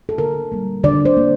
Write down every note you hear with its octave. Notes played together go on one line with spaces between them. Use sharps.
A4
D3 A#4
G3 A#3
D3 D5
C5
A#3